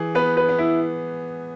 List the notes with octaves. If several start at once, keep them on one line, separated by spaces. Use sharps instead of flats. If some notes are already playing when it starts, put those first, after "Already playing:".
Already playing: E3 G#4
B3 B4
B4
B3
E4